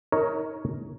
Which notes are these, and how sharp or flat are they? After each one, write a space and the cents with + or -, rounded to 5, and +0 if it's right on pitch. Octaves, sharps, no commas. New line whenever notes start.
D#4 +25 A#4 +0 C#5 +0